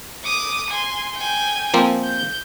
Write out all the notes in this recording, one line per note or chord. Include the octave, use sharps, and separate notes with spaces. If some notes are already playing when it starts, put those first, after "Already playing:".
D6 D#6
G#5 C6
G5 G#5
F3 A#3 C4
G6